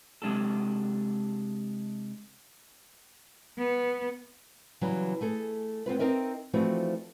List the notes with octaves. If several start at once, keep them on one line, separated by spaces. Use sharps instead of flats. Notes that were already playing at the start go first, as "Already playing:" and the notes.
C3 G#3 D4 G4 A4
B3
C#3 E3 F#3 G3
A3 G#4 A4
B3 C4 F4 B4
C4 D#4 A#4 D#5 E5
E3 F3 A3 C4 D4 F#4